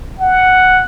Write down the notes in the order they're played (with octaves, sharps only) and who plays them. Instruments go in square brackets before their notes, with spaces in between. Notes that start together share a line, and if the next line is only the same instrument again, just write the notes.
[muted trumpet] F#5